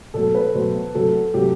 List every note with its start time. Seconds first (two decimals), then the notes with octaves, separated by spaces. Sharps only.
0.14 B2 F#3 A3 A4
0.35 B4
0.54 B2 F#3 A3 C5
0.94 C3 F#3 A3 A4
1.34 C3 F#3 A3 G4